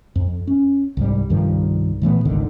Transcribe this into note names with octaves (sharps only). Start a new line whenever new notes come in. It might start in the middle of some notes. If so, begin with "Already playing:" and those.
F2
C#4
C2 G#2 G3
C2 G2 D#3 F3
A#2 E3 A3 B3
G#1 C#2 D3 D#3